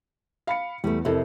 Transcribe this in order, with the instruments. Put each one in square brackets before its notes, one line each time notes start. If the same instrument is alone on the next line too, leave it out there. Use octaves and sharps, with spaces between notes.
[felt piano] F5 B5 C#7
[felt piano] E2 [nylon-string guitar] G3 A3
[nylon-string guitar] F2 C3 [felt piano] E4 A4 A#4